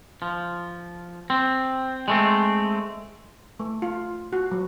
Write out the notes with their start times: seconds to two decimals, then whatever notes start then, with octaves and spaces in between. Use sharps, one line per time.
0.22 F3
1.30 C4
2.08 G#3 A3 C4
3.60 A3
3.82 F4
4.33 F#4
4.51 F#3